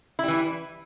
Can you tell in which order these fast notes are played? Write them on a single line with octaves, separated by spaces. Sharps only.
E4 G3 E3